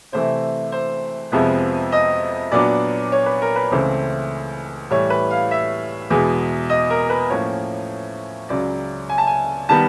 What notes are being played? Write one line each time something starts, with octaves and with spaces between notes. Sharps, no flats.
C3 E3 A3 C4 C5
C5
F2 C3 F3 G#3 B3
D#5
A#2 F#3 B3 D4 D5
C#5
B4
A#4
B4
C#2 C#3 E3 A3 C4 C5
A2 E3 G3 C#5
B4
F5
E5
E2 B2 G#3
D#5
A#4
B4
A2 F3 A#3 C#4 C#5
C#2 C#3 F#3 D5
G#5
A5
G#5
D#3 G3 B3 A5